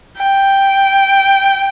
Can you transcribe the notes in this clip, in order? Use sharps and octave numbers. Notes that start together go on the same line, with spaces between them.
G5